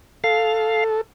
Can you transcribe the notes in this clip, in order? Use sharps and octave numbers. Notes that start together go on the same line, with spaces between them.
A4 F5